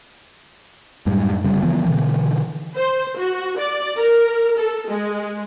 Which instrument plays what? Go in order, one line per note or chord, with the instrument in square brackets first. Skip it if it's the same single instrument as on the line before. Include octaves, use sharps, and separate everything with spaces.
[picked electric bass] F#2 A2 G3 G#3
G1 C#3 G3
C#3 E3 F3 B3
B2 D3 E3
[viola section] C5
F#4
D5
A#4
A4
G#3